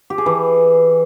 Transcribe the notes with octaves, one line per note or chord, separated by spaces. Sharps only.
G4
G#4
E3